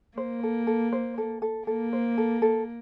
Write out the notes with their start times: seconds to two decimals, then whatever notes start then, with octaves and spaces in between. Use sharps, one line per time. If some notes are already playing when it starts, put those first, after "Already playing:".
0.17 A#3 C5
0.43 A4
0.67 A4
0.92 C5
1.18 A4
1.42 A4
1.67 A#3 A4
1.93 C5
2.18 A4
2.42 A4